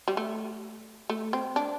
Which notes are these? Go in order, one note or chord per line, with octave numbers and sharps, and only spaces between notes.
G3
A3
A3
C4
D4